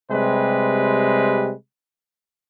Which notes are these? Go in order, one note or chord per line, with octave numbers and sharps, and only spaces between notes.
C3 G3 G#3 B4